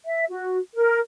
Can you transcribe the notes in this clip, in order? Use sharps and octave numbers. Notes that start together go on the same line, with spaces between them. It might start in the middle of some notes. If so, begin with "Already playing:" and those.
E5
F#4
A#4